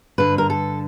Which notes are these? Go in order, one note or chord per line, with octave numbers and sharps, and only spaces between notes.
G2 D3 B4
A#4
A4